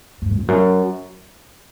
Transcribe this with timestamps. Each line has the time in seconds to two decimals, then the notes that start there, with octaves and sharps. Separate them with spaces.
0.22 G2
0.31 F#2
0.39 F2
0.48 F#2